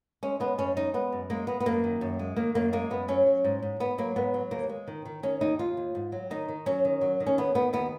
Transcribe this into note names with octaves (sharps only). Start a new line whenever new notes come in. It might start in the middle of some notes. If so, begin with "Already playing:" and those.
G#3 C#4
G#3 B3
F#2 C#4
G#3 D#4
G#3 B3
F#2
G#3 A#3
G#3 B3
B3
F#2 A#3
D#3
F#2
G#3
D#3 A#3
F#2 A#3
G#3 A#3
F#2 B3
F#3 C#4
F#3
G#2
G#2
G#2 B3
F#3 A#3
G#2 B3
F#3
D#2 A#3
G#3
D#3
D#3
D#3 C#4
D#2 D#4
D#2 F4
D#2
G#2
F#3
D#3 D#4
D#3
F#3 C#4
D#3
F#3
D#3
C#4
D#2 B3
D#3 B3
D#2 B3